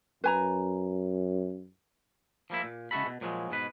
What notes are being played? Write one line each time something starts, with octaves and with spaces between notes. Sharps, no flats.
F#2 B4 G#5 A#5
F3 G3 A#3 E4
A#2
C#3 G#3 E4 F#4 A4 B5
B2
A#2 F3 F#3 G#3
G#2 B2 B4